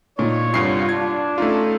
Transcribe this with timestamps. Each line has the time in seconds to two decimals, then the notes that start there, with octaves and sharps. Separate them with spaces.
0.19 A#2 D#4 C#5
0.54 C2 G2 F4 C7
0.89 D4 G#6
1.38 A3 C#4 D#4 F4 A4